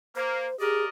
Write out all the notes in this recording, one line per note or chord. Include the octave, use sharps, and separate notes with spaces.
A#3 C5
G4 G#4 A#4 D5 D#5